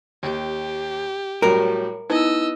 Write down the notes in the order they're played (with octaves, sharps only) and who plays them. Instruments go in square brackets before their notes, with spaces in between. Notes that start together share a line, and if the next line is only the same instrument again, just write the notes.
[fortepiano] D#2 [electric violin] G4
[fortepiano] A2 F#3 G3 [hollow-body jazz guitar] A#4 [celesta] C#5
[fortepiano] B3 [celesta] D#4 E4 [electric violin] D#5 E6